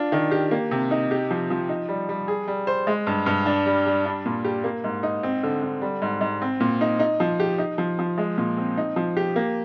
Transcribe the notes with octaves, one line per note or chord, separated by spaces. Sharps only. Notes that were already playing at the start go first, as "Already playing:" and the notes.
Already playing: D4 F4
D#3
G4
A#3
C3
D#4
G4
F3
F3
D#4
G3
G3
G#4
G3
C5
G#3
G2
G2
D4
G3
G3
D4
A#2
G4
A#3
G#2
D#4
C4
D3
D3
G3
G#2
G#2
C4
A#2
D#4
D#4
F3
G4
D#4
F3
F3
G#3
A#2
C4
D#4
F3
G4
A#3